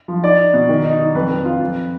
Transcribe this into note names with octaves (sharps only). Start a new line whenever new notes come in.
F3
D#4 D5
D#4
B2
D#3
D#4
D#3
F2 B4
F2
F4
F2